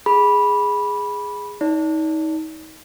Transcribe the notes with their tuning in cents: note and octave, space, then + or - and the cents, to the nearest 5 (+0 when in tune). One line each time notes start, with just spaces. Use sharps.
G#4 +0 B5 -10
D#4 +30 D5 -35